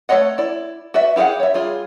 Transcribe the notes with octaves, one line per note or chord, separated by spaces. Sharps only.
A3 F#4 C#5 D#5 F#5
E4 D5
F#4 B4 D5 E5
E4 G4 G#4 F5 F#5
C#5 E5
G3 F4 G#4